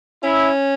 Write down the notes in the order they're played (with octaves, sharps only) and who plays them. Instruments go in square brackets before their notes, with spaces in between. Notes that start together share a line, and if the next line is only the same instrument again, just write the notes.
[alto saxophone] C#4 [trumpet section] E4